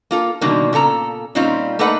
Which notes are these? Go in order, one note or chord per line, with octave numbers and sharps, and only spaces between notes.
A#3 F4 A4
B2 D3 D#3 G3 A#3
A#2 C#3 A4 A#5
A#2 G3 C4 C#4 D#4 F4
A3 A#3 D#4 A4 B4 F#5